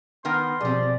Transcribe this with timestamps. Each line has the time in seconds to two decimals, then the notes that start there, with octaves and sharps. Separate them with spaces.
0.25 D#3 B3 A#4 G5 C6
0.61 B2 F3 G3 C4 G#4 D5